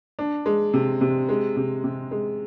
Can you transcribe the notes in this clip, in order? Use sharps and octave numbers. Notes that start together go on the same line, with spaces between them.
D4
G#3
C3
C3
G#3
C3
C3
G#3